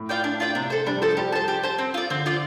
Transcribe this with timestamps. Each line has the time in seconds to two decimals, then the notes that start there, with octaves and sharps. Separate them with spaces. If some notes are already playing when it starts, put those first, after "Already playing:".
Already playing: A2
0.09 F4 D5 G5
0.24 D4
0.40 F4 D5 G5
0.55 C3 D4
0.70 A4 C5
0.87 G3 D4
1.02 F3 A4 C5
1.17 G3 G4
1.32 F3 C5 A5
1.48 G4
1.63 C5 A5
1.79 C4
1.94 F4 D5
2.10 D3 C4
2.26 F4 D5